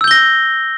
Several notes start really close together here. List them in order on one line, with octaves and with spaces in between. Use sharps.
E6 G6 G7 A#6